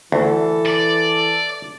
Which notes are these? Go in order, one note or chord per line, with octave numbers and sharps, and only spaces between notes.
D2 E3 A4
D5